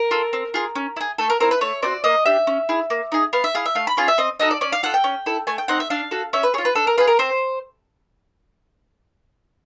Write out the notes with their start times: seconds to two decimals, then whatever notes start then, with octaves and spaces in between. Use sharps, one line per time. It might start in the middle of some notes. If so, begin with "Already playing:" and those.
Already playing: A#4
0.11 F4 A4
0.33 C4
0.54 F4 G#4
0.75 C#4
0.96 E4
1.01 G#4
1.18 A3 A4
1.30 A#4
1.40 C4 E4 A#4
1.51 B4
1.61 A3 C#5
1.82 C4 D#4 F#4 D5
2.04 A#3 D#5
2.25 D4 G4 E5
2.47 C#4
2.69 E4 G#4
2.90 A#3
3.12 D#4 G#4
3.33 B3 F5
3.44 E5
3.55 E4 G#4 F5
3.66 E5
3.75 A3 F5
3.87 B5
3.97 C#4 F4 G#4 F5
4.08 E5
4.18 C4 D#5
4.39 D#4 F#4 A4 D#5
4.51 D5
4.61 C#4 D5
4.72 F5
4.83 F4 A4 F#5
4.94 G5
5.04 C#4
5.26 E4 A4
5.47 A3 G#5
5.58 G5
5.68 C4 D#4 F#5
5.80 E5
5.90 D4 F5
6.11 F#4 A4
6.33 C#4 E5
6.43 B4
6.54 F4 G#4 C#5
6.65 B4
6.75 D4 A4
6.87 A#4
6.98 F4 G#4 B4
7.07 A#4
7.19 C4 C5